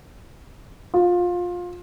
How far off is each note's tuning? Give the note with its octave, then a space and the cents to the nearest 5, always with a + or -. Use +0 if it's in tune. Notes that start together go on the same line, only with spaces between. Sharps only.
F4 +20